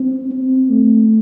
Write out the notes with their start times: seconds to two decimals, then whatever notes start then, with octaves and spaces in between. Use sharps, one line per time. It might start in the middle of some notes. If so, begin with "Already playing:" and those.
Already playing: C4
0.31 C4
0.70 A3